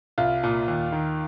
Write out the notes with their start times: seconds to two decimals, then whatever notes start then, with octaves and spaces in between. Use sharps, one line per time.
0.18 C2 F4
0.43 A#2
0.68 D#2
0.92 D#3